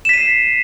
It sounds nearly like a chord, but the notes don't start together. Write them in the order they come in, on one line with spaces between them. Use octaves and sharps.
E7 B6 D#7 C7